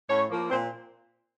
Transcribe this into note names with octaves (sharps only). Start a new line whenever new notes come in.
A2 C#4 C#5
F3 A#3
A#2 C4 C5